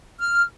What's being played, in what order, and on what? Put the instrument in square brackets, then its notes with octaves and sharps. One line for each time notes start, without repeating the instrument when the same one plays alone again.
[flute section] F6